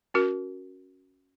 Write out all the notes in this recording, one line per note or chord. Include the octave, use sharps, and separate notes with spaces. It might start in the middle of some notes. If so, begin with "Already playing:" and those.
C#4 F#4 A#4